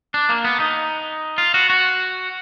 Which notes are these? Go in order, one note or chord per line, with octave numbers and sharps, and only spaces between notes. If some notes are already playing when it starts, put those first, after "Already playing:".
D4
A#3
B3
D#4
F4
F#4
F#4